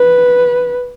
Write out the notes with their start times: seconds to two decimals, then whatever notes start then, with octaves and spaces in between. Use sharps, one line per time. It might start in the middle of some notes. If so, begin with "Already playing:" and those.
Already playing: B4